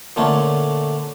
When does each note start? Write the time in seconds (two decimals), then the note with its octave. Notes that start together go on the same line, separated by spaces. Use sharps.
0.16 A#2 D3 A3 C#4